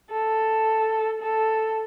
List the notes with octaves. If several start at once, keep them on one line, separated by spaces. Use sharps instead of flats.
A4
A4